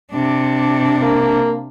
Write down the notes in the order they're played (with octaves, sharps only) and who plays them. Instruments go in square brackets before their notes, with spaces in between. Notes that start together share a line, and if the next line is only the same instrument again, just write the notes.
[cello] C3 D4
[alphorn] A#3